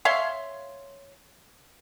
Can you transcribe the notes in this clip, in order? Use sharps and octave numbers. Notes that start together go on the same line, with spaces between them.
C#5 E5 F5 C6